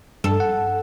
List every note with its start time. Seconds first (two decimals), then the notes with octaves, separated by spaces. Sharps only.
0.24 G2 A4
0.40 F#5